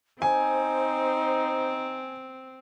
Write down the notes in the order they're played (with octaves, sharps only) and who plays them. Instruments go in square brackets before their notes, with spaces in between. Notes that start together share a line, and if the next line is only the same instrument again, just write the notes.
[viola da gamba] C4 [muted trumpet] D#4 [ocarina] C5 [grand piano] G#5